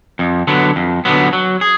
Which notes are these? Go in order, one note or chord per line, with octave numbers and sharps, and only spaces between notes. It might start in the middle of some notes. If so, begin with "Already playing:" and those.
F2
D3 F#3 B3
F2
D3 F#3 B3
F#3
G#4